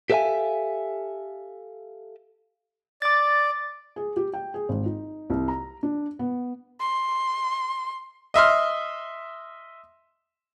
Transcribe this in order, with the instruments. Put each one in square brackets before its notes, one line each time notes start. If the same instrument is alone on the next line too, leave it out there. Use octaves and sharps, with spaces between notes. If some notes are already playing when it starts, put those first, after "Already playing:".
[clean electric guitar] G4 A4 B4 E5 F5 G#5
[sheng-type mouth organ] D5 [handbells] D6 A6
[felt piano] G#4
G4
G5
G#4
G#1
D#4
C2
A#5
D4
B3
[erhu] C6
[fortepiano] D#5 E5 C6 F6